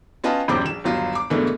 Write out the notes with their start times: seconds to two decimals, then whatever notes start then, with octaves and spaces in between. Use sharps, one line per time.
0.24 C#4 F4 B4 D#5 G5 A5
0.48 D#1 A#1 F#2 G4 C5 D6
0.65 A#1 E7
0.84 G1 D#2 F#3 F4
1.15 D6
1.30 G#2 B2 D3 E3 A3 A#3